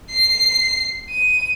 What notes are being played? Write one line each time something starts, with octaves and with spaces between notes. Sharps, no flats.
C7
D#7